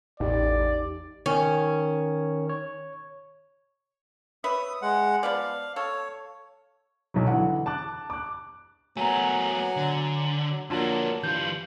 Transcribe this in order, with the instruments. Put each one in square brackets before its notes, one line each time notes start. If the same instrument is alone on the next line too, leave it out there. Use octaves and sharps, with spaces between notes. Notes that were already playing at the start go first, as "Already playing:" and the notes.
[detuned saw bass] A1 [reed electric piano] E2 D#4 G4 [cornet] D5
[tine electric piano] D#3 [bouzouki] C#4
[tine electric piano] C#5
[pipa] B4 C#5 E5 [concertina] D#6
[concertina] G#3 F#5
[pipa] F3 B3 D5 [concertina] F5
[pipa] A4 F5 [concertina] C#5
[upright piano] B1 F#3
D3 E3 F#5
A5 D6 F#6
D6 F#6
[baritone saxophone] F#3 [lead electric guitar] A3 B3 [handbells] G#5 A#5
[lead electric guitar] D3
[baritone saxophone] F#3
[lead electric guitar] F2 A#3 [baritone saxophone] F#3 [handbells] D4 F4 A5
[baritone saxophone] G2 [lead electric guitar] E3 F4 [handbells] G6